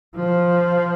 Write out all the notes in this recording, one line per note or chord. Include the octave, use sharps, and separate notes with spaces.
F3